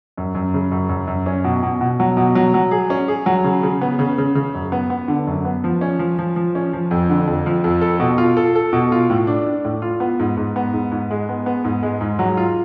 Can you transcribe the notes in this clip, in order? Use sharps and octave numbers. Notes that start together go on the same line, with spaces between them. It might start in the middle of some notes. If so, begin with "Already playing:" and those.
F#2
F#2
C#3
F#2
F#2
F#2
C#4
B2
B2
B2
F#3
B2
F#3
F#3
G#4
C#4
G#4
F#3
C#3
C#3
B3
C#3
C#3
C#3
F#2
B3
B3
D3
F#2
B3
F3
C#4
F3
F3
F3
C#4
F3
F2
D3
F2
F3
F2
A4
B2
F4
A4
A4
B2
F4
A2
D4
D4
A2
F4
B3
G#2
G#2
B3
G#2
G#2
G#3
B3
B3
G#2
G#3
G#2
F#3
F4